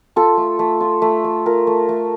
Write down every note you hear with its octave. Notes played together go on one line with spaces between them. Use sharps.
F4 A4
A3
A3
F4
A3
A3
F4 A#4
A3
A3